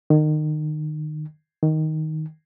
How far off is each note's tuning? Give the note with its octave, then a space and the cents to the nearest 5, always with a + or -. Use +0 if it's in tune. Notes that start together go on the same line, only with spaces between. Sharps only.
D#3 -30
D#3 +5